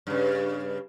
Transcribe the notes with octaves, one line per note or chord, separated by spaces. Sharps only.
G2 C#3